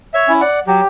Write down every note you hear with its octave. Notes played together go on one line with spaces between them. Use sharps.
C#5 E5
C#4 E4
D5 F#5
F#3 G4